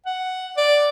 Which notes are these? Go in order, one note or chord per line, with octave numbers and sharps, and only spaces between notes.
F#5
D5